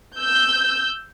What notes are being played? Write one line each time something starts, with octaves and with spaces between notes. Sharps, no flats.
E6 G6